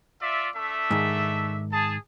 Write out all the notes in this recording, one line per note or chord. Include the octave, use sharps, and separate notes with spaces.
F4 D5 E5
A3 D4 E5
G#2 D#3
G#4 A5